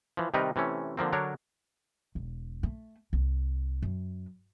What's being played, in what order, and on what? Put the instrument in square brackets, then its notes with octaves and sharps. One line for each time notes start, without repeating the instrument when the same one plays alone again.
[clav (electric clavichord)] E3 F3
C3 D#3 G3 D#4 A#4 B4
C3 E3 A3 C#4
D3 F3 A#3 C4
D3 F#3 D4 A#4 C#5
[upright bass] E1
A3
C2
F#2